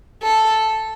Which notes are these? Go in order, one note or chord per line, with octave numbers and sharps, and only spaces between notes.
A4